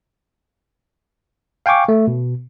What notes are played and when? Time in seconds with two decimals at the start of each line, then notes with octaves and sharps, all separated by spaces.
1.66 F5 G5 G#5 C#6 D6
1.89 A3
2.07 B2